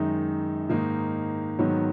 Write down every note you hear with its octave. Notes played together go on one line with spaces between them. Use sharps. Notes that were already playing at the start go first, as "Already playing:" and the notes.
Already playing: F#2 D#3 G#3 D#4
G#2 D#3 A#3 D#4
G#2 D#3 F#3 B3